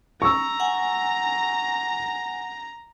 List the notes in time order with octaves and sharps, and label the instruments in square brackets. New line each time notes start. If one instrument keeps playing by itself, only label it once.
[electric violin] A#5 [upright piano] C#6 E6
[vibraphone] F#5 G#5